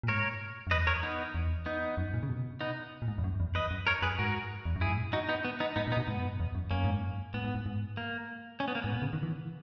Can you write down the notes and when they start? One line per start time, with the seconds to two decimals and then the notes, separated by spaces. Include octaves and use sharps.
0.03 A#2
0.08 G#2 A#4 C#5
0.67 F#2
0.71 E2 B4 D#5
0.87 A#4 C#5
1.03 B3 D#4
1.35 E2
1.66 B3 D#4
1.97 F#2
2.14 A#2
2.23 C#3
2.29 B2
2.61 B3 D#4
3.02 A#2
3.08 G#2
3.18 E2
3.24 F#2
3.40 E2
3.55 E2 B4 D#5
3.71 F#2
3.87 A#4 C#5
4.02 F#2 G#4 B4
4.19 G#2 F#4 A#4
4.65 E2
4.76 F#2
4.81 E4 G#4
4.87 G#2
4.97 A#2
5.13 D#4 F#4
5.29 B3 D#4
5.45 B3
5.60 B3 D#4
5.76 G#2 B3 D#4
5.87 A#2
5.92 B3 D#4
5.97 B2
6.08 G#2 B3
6.18 F#2
6.27 G#2
6.40 E2
6.55 F#2
6.71 F#2 A#3 C#4
6.84 G#2
6.99 F#2
7.34 G#2 B3
7.44 G#2
7.55 G#2
7.66 G#2
7.97 A#3
8.60 C#4
8.68 B3
8.75 A#3
8.82 G#2 B3
8.92 A#2
9.02 C#3
9.13 D#3
9.23 E3